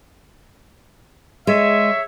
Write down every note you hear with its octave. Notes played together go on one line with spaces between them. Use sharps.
G#3 C#5 E5